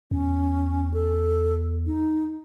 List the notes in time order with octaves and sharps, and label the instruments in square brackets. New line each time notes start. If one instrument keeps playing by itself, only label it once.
[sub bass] E2 [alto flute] C#4
[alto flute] A4
D#4